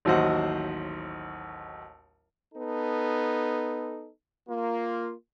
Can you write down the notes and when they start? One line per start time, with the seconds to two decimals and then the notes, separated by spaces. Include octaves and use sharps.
0.05 A1 D#2 F#3 C5 D#5 F#5
2.54 B3 D#4 A4
4.48 A#3 F4